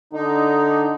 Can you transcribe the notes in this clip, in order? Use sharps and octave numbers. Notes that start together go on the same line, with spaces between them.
D3 D#4